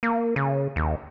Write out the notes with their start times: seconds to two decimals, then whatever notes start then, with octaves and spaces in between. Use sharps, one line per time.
0.03 A#3
0.36 C#3
0.76 D#2